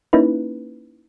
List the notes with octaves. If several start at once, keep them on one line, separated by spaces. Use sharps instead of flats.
A#3 C#4 D#4 E4 B4